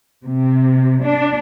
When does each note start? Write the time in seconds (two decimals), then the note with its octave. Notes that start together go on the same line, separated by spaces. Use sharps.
0.24 C3
1.02 D4